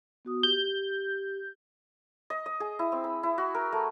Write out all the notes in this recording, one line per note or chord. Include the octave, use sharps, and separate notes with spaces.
B3 F#4 D#6
G4 G6
D#5
D#5
G#4
E4
C4
B5
E4
F#4
A#4
A3